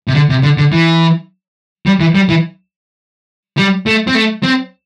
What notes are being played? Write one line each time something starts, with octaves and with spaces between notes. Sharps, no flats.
C3
D3
C3
D3
D3
E3
G3
E3
G3
E3
G3
A3
C4
A3
C4